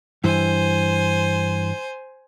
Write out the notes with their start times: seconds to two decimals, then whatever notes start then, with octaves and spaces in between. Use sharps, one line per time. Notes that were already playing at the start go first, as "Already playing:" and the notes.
0.24 G2 E3 C5 G#5